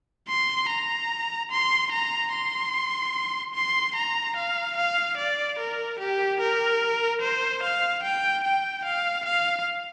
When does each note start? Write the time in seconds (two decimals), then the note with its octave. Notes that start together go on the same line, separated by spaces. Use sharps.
0.28 C6
0.69 A#5
1.51 C6
1.91 A#5
2.32 C6
3.54 C6
3.95 A#5
4.36 F5
4.77 F5
5.17 D5
5.58 A#4
5.99 G4
6.40 A#4
7.21 C5
7.62 F5
8.03 G5
8.43 G5
8.84 F5
9.25 F5